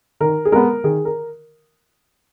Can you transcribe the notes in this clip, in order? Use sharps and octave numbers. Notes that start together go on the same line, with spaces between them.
D#3 A#4
G#4
G#3 B3 A#4
D#3 G#4
A#4